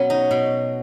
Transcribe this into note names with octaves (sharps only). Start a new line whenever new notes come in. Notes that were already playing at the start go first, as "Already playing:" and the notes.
Already playing: B2 F#3 B3 C#4
D#4
B2